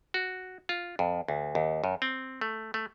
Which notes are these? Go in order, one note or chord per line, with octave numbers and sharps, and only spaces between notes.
F#4
F4
F2
D2
D#2
F#2
C4
A3
A3